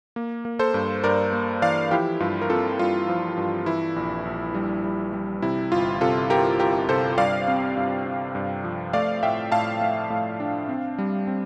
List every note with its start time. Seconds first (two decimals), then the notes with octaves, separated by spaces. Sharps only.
0.16 A#3
0.45 A#3
0.59 A4 C5
0.74 G2
1.04 G2 A#4 D5
1.33 A#3
1.62 E3 D5 F5
1.91 F3 E4 G4
2.20 G2 F4
2.41 A#4
2.50 C4 F4 A4
2.79 G2 F4
3.09 F3
3.37 G2
3.66 E3 E4
3.96 A#1
4.25 A#1
4.54 G3
4.84 G3
5.13 G3
5.42 C3 E4
5.72 G1 F4
6.01 C3 F4 A4
6.30 G1 G4 A#4
6.60 G1 G4 A#4
6.89 C3 A4 C5
7.18 G2 D5 F5
7.48 C4
7.76 G2
8.05 C4
8.35 G2
8.64 F3
8.93 A3 D5 F5
9.23 A2 E5 G5
9.52 A2 F5 A5
9.81 A3
10.10 A2
10.40 D4
10.69 C4
10.98 G3
11.27 C4